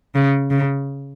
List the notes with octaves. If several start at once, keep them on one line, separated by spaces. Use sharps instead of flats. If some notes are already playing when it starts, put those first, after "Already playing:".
C#3
C#3